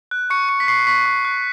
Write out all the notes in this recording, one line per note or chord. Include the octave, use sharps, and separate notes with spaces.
F#6
C#6 C#7
C#6 C#7
B6
C#6 C7
C#6 B6
C#6
F#6